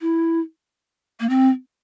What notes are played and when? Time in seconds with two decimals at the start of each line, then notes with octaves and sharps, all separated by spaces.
0.01 E4
1.20 A#3
1.29 C4